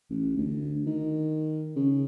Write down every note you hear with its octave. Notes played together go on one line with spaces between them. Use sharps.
A1
D2
D#3
C#3